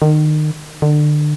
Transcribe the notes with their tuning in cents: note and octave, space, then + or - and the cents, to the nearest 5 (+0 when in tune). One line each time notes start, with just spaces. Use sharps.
D#3 -30
D3 +30